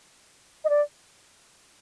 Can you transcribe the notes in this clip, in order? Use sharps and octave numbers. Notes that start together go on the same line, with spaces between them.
D#5
D5